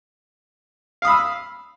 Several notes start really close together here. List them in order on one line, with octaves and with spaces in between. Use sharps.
F5 D#6 B5 E6